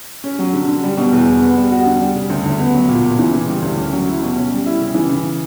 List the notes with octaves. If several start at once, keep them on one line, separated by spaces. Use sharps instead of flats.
C#4
F#3
D3
D3
G3
B2
E2
E2
B3
G3
F#4
D3
G3
C#3
D2
D2
B3
F#3
A#2
A#2
E3
C#3
G3
D2
C#4
F#3
E4
B2
C#4
G3
E4
C#3
E3
C#3